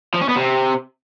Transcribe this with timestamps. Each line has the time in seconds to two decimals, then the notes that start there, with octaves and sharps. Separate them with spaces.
0.14 F3
0.21 C#4
0.29 B3
0.36 C3